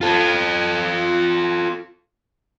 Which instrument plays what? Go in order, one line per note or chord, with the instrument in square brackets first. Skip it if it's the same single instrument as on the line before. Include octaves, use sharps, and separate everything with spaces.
[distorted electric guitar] F4 A4